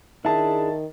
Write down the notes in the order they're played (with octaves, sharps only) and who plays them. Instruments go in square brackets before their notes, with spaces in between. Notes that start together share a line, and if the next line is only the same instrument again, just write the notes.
[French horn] D#3 [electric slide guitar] D4 E4 G#4 [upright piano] E5 A5